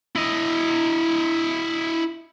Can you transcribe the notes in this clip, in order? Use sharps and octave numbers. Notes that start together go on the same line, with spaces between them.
E4 D#5